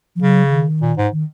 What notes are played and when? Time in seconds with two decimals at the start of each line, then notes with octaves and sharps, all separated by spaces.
0.16 F3
0.21 C#3 F#3
0.51 D#3
0.82 A#2
0.97 G#2
1.12 D#3